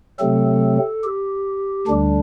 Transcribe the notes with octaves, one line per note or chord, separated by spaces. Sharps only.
C3 F#3 A3 C4 A4
G4
D2 D3 G3 D4